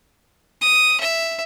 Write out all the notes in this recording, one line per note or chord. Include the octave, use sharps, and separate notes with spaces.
D#6
E5